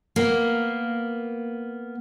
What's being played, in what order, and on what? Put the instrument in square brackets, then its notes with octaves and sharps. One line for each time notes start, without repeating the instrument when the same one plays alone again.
[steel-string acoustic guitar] A#3 B3